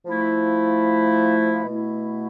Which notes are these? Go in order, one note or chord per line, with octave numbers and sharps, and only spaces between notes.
F3 A3 E4
B2 A3 E4